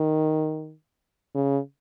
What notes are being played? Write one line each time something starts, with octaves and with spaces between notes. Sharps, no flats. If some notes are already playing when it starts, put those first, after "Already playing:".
Already playing: D#3
C#3